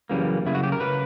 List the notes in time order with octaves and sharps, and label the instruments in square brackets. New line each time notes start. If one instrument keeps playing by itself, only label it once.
[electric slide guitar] F#2 C#3 E3 G3 A#3
F#2 C#3 E4
F#4
G4
A#4
C#3 B4